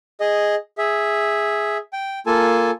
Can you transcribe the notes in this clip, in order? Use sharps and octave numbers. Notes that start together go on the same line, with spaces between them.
G#4 D#5
G#4 E5
G5
A#3 F4 A4 G#5 A5